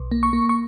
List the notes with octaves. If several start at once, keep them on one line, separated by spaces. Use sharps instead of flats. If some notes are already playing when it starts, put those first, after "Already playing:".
Already playing: B1
A#3
C#6
A#3
C#6